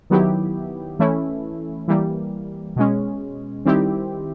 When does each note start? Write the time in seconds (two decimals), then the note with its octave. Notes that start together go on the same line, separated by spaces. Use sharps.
0.10 D#3 F#3 B3 E4 G4
0.99 E3 A3 C#4 E4
1.88 E3 G3 A#3
2.76 B2 G#3 C#4
3.66 D#3 G3 C4 E4 G4